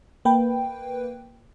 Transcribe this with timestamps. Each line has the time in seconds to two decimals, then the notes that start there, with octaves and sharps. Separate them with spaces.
0.25 A#3 B4 G5